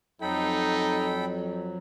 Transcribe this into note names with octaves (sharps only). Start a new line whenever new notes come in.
F2 F#3 D#4 A4 G5 B5